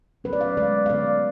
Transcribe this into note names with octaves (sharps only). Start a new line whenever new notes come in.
C#3 F#3 A3 C#4 B4
D5
F5
D3 G#3 B3 D5
F5
D3 G#3 B3 D5